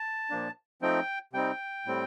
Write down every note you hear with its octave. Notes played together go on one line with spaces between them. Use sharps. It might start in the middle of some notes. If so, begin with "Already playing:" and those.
Already playing: A5
A#2 F3 A#3 D4
F3 A3 C4 D#4 G5
C3 G3 C4 D#4 G5
A2 G3 C4